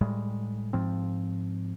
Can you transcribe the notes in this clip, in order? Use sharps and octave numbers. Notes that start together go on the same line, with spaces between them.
A2 G3 G#3
G#2 F3 C4